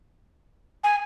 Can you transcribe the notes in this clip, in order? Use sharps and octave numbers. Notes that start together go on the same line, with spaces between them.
G#5